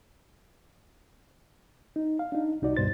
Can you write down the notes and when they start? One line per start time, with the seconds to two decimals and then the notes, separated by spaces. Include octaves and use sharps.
1.96 D#4
2.19 F5
2.32 D4 D#4
2.62 C2 D#4 F#4 D5
2.77 D2 G2 B2 C5 A6